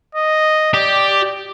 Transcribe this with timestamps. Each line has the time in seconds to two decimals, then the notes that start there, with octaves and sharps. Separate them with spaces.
0.15 D#5
0.74 G4 D5